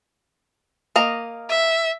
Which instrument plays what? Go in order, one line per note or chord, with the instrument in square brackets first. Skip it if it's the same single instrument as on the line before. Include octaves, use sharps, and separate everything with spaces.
[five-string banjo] A#3 D#5 A#5
[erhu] E5